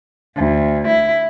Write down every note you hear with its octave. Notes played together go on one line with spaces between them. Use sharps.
D2
E4